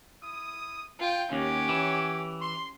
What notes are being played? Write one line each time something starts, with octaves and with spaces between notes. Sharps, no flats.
E4 D#6
F4 G5
D#2 C#4 G4 C#5 F#5 D6
E3
C6